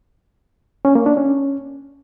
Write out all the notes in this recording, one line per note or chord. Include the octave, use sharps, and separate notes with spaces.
C#4
A#3
D4
C#4